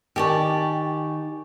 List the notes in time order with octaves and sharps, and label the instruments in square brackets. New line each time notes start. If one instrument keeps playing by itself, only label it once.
[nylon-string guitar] D#3 [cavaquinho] G4 D5 A5 [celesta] G#5 C#6